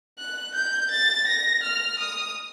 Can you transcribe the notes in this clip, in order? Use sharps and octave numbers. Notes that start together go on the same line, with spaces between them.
F#6
G6
A6
A#6
F6
D#6